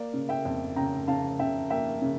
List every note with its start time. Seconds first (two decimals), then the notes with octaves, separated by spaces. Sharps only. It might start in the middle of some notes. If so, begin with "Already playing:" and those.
Already playing: A#3 D5 F5
0.14 C#3
0.29 E5 G5
0.45 F2
0.76 C#3 G5 A#5
1.08 C#3 F5 A5
1.39 C#3 E5 G5
1.70 A#3 E5 G5
2.02 C#3